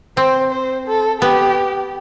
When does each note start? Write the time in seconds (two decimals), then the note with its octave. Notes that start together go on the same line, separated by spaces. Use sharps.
0.17 C4 C5
0.52 C5
0.87 A4
1.21 B3 G4